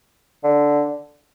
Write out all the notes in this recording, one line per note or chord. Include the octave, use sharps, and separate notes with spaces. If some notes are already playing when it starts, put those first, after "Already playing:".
D3